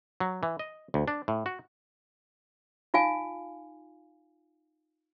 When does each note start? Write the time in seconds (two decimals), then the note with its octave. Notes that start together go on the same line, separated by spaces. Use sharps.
0.20 F#3
0.43 E3
0.59 D#5
0.94 D2
1.08 D4
1.28 A2
1.46 F#4
2.94 D#4 F4 F5 G#5